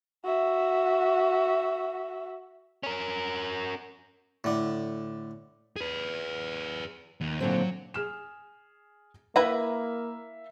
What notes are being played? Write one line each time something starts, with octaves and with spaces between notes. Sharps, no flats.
F#4 E5
C#4 A#4
A2 D3
G#4 B4
D#2
A#2 D3 F#3 C4
G#4 F6 E7
A#3 E4 B4 E5 F5 A#5